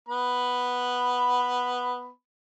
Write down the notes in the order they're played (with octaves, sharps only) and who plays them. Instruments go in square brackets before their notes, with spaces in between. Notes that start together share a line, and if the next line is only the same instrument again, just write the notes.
[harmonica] B3 B5